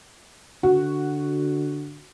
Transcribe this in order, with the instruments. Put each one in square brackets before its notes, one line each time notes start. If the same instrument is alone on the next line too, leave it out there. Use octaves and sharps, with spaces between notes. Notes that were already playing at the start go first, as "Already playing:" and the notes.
[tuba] D3 [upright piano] F#4